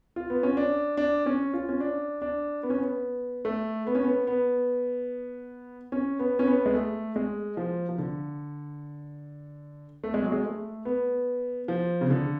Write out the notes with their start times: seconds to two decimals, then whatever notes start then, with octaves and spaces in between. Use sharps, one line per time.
0.16 F4
0.30 B3
0.43 C#4
0.57 D4
0.97 D4
1.26 C#4
1.54 F4
1.69 C#4
1.80 D4
2.22 D4
2.63 B3
2.70 C#4
2.79 B3
3.45 A3
3.87 B3
3.95 C#4
4.04 B3
4.27 B3
5.92 C#4
6.19 B3
6.39 C#4
6.47 B3
6.66 G#3
6.74 A3
7.16 G#3
7.57 F3
7.89 F3
7.98 D3
10.04 A3
10.14 G#3
10.23 F#3
10.32 G#3
10.45 A3
10.85 B3
11.68 F3
12.01 C#3
12.10 D3